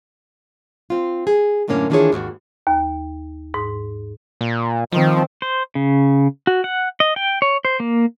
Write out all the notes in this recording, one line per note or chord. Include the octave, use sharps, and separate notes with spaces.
C4 F4
G#4
F#2 A2 D3 A#3 C#4
D#3 E3 D4 F4 G#4 C#5
D#2 G#2 F#4
D#2
G#2
A#2
D#3 F3 C4
C5
C#3
F#4
F#5
D#5
G5
C#5
C5
A#3